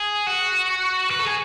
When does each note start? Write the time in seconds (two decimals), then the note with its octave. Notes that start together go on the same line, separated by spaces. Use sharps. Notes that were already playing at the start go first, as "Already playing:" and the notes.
Already playing: G#4
0.27 F#4
1.11 B4
1.19 A4
1.27 G#4